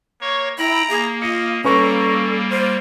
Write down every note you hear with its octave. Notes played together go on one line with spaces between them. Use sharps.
A#3 C#5 C#6
E4 G5 A#5 B5
A#3 G#4
F4 D#5 C#7
G3 A#3 C#4 A4 B4 A#5 C#6
F4 C5